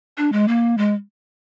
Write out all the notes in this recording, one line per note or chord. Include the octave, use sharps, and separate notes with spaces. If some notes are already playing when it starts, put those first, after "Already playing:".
D4
G#3
A#3
G#3